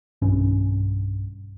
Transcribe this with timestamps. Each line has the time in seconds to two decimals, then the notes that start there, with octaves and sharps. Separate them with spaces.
0.22 B1 G2 C#4